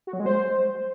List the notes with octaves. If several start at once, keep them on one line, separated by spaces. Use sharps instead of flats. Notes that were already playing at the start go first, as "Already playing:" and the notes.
F#4
F#3
G#3
C5